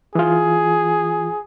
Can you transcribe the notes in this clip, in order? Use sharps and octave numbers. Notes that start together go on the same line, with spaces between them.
E3 F4 G#4